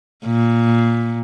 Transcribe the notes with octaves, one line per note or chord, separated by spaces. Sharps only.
A#2